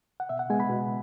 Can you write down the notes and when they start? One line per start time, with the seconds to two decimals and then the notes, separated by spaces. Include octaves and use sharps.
0.20 F#5
0.29 B2 E5
0.39 F#5
0.50 G#3 B3 G#5
0.60 B5
0.70 B2